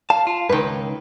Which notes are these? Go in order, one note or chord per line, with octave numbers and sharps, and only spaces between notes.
F5 A5
F4
C#2 G2 D#3 B4